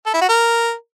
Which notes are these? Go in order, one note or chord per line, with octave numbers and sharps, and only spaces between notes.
A4
E4
F#4
A#4